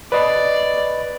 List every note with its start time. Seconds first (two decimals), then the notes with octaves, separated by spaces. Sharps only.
0.12 B4 D5 D#5 B5